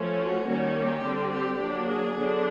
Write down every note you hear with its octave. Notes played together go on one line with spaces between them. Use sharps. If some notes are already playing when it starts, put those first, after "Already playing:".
Already playing: F3 A3 C#4
F#4
D#3 G3 A#3 C#4
G4
D3 G3 C4
G4
F#3 A#3 D4
G#4
D3 F#3 B3 D4